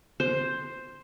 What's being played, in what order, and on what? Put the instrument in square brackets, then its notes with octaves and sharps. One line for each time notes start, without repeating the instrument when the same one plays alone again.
[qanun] C5